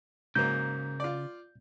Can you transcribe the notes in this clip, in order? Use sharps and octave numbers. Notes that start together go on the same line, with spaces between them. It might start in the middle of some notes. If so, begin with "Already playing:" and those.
G#2 C#3 F#3 A#3 G6
F4 D5